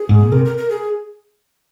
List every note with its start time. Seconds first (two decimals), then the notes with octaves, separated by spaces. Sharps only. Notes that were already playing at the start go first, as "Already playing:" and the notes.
Already playing: G#4
0.09 G#2
0.21 A#2
0.32 C3 A#4
0.45 A#4
0.58 A#4
0.70 G#4